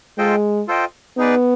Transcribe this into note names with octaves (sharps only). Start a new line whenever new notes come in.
G#3 F4 A4 C5 D#5 G5
F4 A4 C5 D#5 G5
B3 D#4 G#4 B4 D5